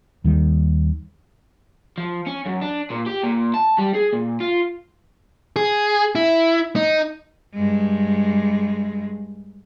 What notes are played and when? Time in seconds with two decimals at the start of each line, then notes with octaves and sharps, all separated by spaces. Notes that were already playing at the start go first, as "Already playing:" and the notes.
0.24 D#2 D#3 G3
1.98 F3
2.27 C#4
2.46 F#2
2.62 D4
2.90 A#2
3.06 G4
3.23 A#2
3.54 A5
3.78 G3
3.94 G#4
4.13 A#2
4.40 F4
5.56 G#4
6.15 E4
6.76 D#4
7.54 G2 G#3